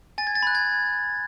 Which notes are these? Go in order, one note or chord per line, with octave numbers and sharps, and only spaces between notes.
G#5 A6
G#6
A6
B5 F#6
G#6